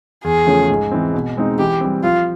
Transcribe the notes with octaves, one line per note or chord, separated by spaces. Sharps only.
E2 G#4
C#3 F3 A3 C#4
G#2
E3 G#3 C4
B2
G#3 C4 D#4
E3 G4
G3 C4
F3 F4